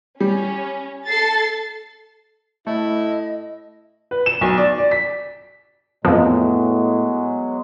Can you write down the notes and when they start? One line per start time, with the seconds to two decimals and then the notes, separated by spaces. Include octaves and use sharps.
0.20 G3 C#4
1.07 A4 A6 C7
2.67 A2 A3 E4 D#5
4.11 B4
4.26 E7
4.41 B1
4.58 D5
4.78 D5
4.91 B6
6.05 F2 A2 F3 F#3 G#3 B3 D#5